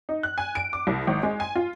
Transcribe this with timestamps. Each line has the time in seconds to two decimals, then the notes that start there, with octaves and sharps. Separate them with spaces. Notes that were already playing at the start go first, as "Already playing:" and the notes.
0.09 D#4
0.23 F#6
0.38 G#5
0.55 D7
0.73 D6
0.87 C2
1.07 G#1
1.23 G#3
1.40 G#5
1.55 F4